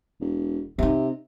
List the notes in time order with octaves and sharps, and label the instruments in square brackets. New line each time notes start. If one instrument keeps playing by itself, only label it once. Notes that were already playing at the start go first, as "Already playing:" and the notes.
[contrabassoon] E1
[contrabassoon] C3 [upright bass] C4 D#4